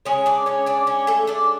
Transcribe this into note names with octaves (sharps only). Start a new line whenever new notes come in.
C#3 G#3 C#4 C#5
D4 D5
C#4 C#5
D4 D5
C#4 C#5
A3 A4
D4 D5